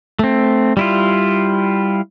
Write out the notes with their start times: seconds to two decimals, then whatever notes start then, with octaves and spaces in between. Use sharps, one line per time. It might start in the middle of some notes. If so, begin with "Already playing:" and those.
0.19 A3 C4
0.77 G3 E4 F4